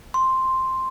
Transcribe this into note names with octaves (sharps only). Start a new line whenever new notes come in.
C6